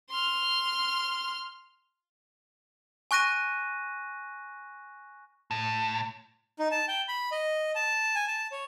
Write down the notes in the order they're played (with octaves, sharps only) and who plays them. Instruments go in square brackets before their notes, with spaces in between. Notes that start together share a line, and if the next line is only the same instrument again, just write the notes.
[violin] C6 F6
[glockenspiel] G#5 C#6 F#6 A#6 D#7
[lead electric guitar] A2
[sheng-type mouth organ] D#4
A5
G5
B5
D#5
A5
G#5
A5
C#5